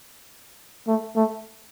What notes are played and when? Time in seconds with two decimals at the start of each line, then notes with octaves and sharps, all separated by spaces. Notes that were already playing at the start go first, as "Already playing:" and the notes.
0.87 A3
1.16 A3